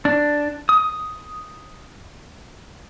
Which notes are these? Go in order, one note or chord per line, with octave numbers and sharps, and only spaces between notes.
D4
D#6